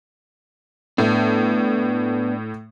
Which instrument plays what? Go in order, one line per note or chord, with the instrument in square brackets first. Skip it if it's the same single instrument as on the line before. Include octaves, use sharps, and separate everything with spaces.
[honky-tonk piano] A2 [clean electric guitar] B3 D4